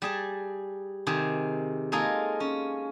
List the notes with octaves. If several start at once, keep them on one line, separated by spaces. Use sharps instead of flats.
G3 G#4 A5
C3 D#3 G#4 C5
G#3 A#3 D#4 F4 G#4 A4
C#4